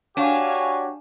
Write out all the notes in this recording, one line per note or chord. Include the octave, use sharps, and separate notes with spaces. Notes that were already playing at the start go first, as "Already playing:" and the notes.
D4 F#4 G4 C#5 F5 G#5